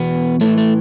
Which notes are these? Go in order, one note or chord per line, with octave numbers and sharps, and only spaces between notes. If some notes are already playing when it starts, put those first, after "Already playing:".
Already playing: E2 B2 B3
A2 E3 A3
A3